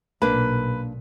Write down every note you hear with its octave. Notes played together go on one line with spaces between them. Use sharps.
B1 A#2 A#3 D4 B4